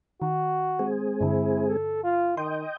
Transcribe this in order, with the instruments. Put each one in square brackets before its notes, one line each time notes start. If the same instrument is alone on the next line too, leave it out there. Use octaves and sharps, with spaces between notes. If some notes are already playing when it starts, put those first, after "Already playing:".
[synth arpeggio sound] D#3 [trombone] F#4
[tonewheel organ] G#3 C4 G#4
[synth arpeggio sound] G2 D3 [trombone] E4
[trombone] A4
F4
[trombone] D#3 [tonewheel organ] D#5 G5 [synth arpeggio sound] C6